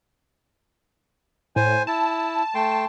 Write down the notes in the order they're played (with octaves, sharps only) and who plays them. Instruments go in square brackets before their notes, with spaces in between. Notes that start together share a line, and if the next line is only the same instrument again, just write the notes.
[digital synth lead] A2 [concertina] C5 G#5
[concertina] E4 [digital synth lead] A5
[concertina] A3 G5 C6